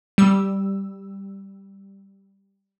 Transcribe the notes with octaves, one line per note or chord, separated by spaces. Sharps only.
G3 E6